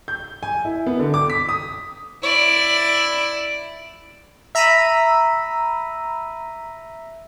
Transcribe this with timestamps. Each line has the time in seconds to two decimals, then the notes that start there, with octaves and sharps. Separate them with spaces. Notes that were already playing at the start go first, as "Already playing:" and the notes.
0.08 G6
0.43 G#5
0.65 E4
0.86 B3
0.99 D3
1.14 D6
1.30 B6
1.49 D#6
2.23 E4 D5
4.55 E5 A#5 B5 E6 B6 D#7